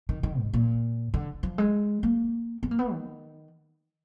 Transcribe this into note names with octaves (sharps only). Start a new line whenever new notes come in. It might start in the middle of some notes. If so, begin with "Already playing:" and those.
D#3
D#3
G#2
A#2
D3
F3
G#3
A#3
B3
A#3
B3
D#3